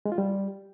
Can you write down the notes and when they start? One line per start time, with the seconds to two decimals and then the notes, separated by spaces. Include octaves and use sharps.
0.05 G#3
0.12 F4
0.18 G3